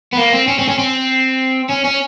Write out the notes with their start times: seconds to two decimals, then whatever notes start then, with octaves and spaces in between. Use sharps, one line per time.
0.13 B3
0.18 A#3
0.33 C4
0.48 C#4
0.59 C4
0.68 C#4
0.78 C4
1.70 C#4
1.85 C#4